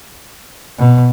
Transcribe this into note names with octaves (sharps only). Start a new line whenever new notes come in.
B2